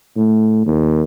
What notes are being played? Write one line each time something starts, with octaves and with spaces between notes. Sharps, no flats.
A2
D#2